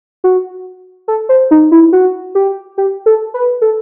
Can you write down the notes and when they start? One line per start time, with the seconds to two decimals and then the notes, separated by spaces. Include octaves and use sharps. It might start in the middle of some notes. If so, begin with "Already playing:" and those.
0.24 F#4
1.08 A4
1.29 C5
1.51 D#4
1.72 E4
1.93 F#4
2.35 G4
2.78 G4
3.06 A4
3.34 B4
3.62 A4